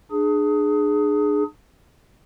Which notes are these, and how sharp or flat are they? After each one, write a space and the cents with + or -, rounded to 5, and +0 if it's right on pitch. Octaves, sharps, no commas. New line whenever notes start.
D4 +35 G#4 +10